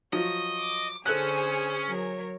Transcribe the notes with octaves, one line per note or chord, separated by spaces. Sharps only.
F3 F#3 D#5 C#6
D6
D3 C#4 G#4 A4 C5 F#6
F#3 A#4 C#5